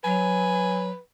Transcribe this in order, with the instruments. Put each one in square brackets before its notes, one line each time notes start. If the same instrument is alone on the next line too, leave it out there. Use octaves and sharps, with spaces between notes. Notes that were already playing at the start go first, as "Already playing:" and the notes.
[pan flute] F#3 [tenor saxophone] B4 [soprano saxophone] G#5